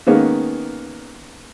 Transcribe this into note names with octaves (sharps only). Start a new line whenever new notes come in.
D#3 G#3 A#3 B3 C#4